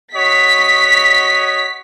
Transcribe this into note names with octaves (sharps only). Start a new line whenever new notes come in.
F#4 C#5 D#5 B6